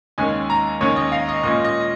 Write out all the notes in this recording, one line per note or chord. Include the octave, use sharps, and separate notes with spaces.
D#2 D#3 G#3 C#4 G#5
A#5
D#2 D#3 G#3 C#4 C#5
D#5
F5
D#5
A#2 G#3 C#4 D#5
D#5